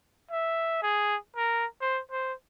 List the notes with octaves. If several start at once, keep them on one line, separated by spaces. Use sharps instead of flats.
E5
G#4
A#4
C5
C5